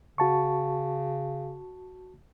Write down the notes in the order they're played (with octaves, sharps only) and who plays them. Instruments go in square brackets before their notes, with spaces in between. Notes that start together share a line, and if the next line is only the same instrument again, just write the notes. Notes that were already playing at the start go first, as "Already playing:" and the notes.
[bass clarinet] C#3 [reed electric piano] F#4 A5 C#6